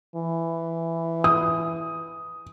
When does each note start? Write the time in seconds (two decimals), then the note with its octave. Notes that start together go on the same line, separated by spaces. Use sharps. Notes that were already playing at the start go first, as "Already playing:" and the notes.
0.16 E3
1.24 D#6